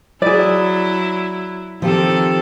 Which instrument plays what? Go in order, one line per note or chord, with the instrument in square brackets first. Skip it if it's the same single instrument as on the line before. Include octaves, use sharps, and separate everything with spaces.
[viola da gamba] F#3 E4 [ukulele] G#4 D5
[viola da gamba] D#3 C4 A4 [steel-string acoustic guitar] F3 F4 G4